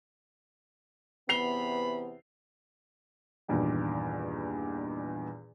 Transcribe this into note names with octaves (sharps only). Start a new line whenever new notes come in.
E2 C3 B3 B5 C7 F7 G7
E2 G2 A#2 D#3